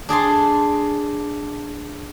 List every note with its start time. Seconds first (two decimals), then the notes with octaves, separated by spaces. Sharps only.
0.09 D4 G#4 A5 C6